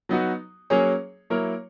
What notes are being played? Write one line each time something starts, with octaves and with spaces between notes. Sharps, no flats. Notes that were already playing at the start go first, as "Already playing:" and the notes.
F#3 B3 D#4 F#4
F#3 A#3 C#4 G#4 C#5
F#3 A#3 E4 A#4 C#5